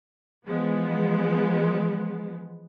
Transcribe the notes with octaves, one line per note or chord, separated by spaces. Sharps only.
E3 F3 G#3 B3